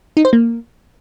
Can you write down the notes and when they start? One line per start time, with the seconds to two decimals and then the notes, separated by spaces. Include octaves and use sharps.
0.17 D#4
0.25 C5
0.33 A#3